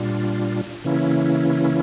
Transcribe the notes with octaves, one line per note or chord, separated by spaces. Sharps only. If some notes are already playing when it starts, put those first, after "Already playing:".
Already playing: A#2 G3 D4 F4
C#3 E3 A#3 C#4 E4